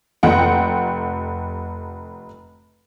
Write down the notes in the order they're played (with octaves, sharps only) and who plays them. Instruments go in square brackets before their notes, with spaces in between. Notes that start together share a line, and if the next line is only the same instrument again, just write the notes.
[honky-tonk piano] F1 F#5 G5